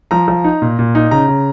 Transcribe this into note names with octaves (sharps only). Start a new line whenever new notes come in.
F3 A#5
F3
D#4
A#2
A#2
D#4
C#3 A#5
C#3